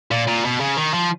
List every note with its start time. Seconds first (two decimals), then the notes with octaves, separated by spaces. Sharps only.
0.11 A#2
0.27 A#2
0.45 B2
0.60 C#3
0.77 D#3
0.94 F3